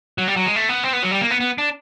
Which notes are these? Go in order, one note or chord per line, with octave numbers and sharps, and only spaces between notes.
F#3
G3
F#3
G#3
A3
B3
C4
B3
F#3
G3
A#3
B3
B3
D4